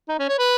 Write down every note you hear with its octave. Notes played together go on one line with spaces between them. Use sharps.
D#4
C#4
C#5
B4